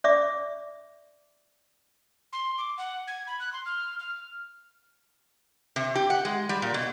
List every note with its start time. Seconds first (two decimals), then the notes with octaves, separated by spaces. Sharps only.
0.04 D5 E5 D6
2.33 C6
2.58 D6
2.78 F#5
3.07 G#6
3.27 B5
3.40 F#6
3.53 C6
3.66 F6
3.99 F6
5.76 C3
5.95 G4
6.10 F#5
6.25 G#3
6.49 G3
6.62 A#2
6.74 B2